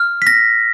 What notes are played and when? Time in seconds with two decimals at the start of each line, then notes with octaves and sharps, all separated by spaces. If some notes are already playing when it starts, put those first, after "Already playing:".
Already playing: F6
0.22 B6
0.27 A#6